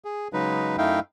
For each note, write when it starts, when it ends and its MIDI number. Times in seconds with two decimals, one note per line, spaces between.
0.05 0.28 68
0.33 0.76 49
0.33 0.76 54
0.33 0.76 56
0.33 0.76 63
0.33 0.76 71
0.78 1.00 42
0.78 1.00 57
0.78 1.00 63
0.78 1.00 64
0.78 1.00 77
0.78 1.00 79